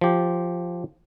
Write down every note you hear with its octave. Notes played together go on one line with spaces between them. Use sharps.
F3 G4